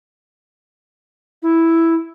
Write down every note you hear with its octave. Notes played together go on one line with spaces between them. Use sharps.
E4